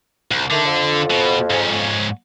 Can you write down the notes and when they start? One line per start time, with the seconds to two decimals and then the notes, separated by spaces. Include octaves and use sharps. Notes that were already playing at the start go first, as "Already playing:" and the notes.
0.31 C2
0.51 D3 D#3 A3
0.65 F2
1.11 B2
1.50 G#2 C#4